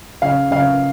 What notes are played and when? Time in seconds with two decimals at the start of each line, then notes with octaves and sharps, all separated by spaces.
0.22 C#3 F5
0.51 C#3 F5